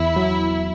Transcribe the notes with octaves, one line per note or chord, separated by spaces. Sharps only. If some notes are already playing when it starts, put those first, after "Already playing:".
Already playing: E2 B3 E4
F#3